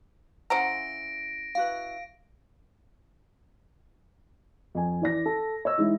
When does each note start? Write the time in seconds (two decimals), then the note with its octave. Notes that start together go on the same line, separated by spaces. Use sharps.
0.50 C#3 E4 C5 F#5 A#5 A#6 D7
1.55 E4 F#4 B4 F5
4.75 F2 G#5
5.01 E3 D5 A#6
5.26 A4
5.65 C#5 D#5 E6
5.78 E3 G#3 D#4 E4